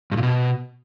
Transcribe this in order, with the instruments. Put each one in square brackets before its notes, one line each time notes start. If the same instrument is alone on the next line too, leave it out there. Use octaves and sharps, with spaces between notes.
[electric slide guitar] G2
A#2
B2